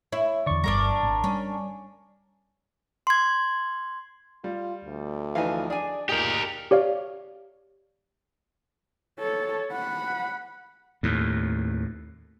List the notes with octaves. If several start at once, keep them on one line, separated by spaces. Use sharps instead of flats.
E4 C#5
E2 D3 D5 C#6
G1 G3 D4 A#4 A#5
G#1
G3 C#4
C6 G#6
G3 F4
D2
E3 F3 D#4 F5 G#5
D4 G#4 D5 G#5
A#2 D#4 G4 G#4 A#4
G4 C#5 D5 F5
A4 C#5
F#5 B5
D#2 A2